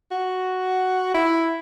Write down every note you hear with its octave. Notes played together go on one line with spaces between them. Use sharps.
F#4
E4